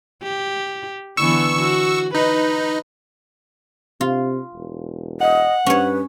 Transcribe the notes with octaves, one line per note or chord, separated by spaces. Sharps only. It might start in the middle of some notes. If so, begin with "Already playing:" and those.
G4
D3 E3 B3 C#6 E6
F#4
D#4 B4
C3 F4
E1
D#5 F#5
G2 C#4 B4 C#5